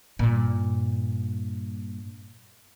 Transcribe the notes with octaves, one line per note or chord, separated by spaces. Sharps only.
G2 A#2